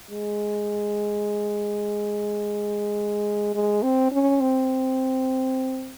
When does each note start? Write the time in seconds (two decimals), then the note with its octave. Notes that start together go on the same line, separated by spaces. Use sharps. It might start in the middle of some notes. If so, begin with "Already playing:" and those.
0.11 G#3
3.55 G#3
3.83 C4
4.12 C#4
4.41 C4